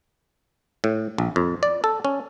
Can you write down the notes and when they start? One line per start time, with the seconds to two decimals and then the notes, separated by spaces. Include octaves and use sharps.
0.84 A2
1.18 A#1
1.36 F2
1.63 D5
1.84 A4
2.05 C#4